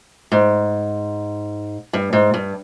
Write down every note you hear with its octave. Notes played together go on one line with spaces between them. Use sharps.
G#2
G2
G#2
G2